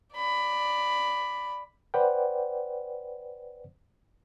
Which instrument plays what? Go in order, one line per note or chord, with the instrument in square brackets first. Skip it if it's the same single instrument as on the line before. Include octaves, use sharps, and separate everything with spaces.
[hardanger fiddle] D5 B5
[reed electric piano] B4 C5 D5 F#5 G5